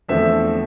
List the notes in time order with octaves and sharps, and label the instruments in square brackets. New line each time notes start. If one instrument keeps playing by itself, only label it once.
[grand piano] E2 D3 F3 A3 C4 E5